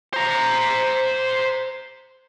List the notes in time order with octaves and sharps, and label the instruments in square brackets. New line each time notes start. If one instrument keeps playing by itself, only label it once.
[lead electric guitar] C5 A#5